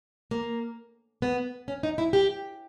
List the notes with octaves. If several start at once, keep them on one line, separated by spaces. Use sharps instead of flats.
A#3
B3
C#4
D#4
E4
G4